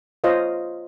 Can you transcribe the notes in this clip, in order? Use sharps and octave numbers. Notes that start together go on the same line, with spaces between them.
F4 C5 C#5 D#5 F5